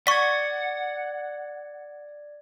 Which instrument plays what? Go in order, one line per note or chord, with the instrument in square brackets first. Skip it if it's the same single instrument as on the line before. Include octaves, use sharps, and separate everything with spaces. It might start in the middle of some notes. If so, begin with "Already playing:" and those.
[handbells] D5 G#6 [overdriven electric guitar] F#5 [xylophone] C#6 B6